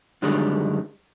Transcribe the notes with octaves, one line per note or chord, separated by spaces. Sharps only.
F#2 D3 D#3 G3 G#3 D4